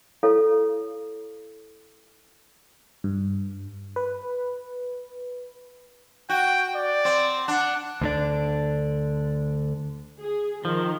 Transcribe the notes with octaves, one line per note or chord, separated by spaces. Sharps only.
E4 A4 C#5 F5
G2
B4
F#4 G5
D5
C4
D4 F#5
D2 D3 D4
G#4
D#3 F3